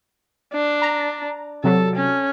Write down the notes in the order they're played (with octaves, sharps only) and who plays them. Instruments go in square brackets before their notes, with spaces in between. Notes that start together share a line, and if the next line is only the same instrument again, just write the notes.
[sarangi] D4
[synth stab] A#5
[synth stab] C3 F#3 [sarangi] A4
[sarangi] C#4